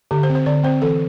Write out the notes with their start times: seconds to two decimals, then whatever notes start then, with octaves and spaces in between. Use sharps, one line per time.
0.11 D3 G4
0.23 C5
0.30 C4
0.35 C5
0.46 D3 D5
0.64 C4 C5
0.82 E3 A4